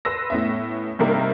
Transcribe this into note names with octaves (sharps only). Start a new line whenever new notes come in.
B4 C6 E6 A#6
A2 B3 C#4 E5
G2 C3 G3 A#3 D#4